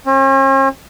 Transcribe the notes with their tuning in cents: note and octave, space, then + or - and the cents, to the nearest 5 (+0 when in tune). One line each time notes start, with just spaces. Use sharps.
C#4 -45